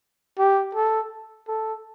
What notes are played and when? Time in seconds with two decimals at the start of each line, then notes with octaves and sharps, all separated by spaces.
0.38 G4
0.75 A4
1.48 A4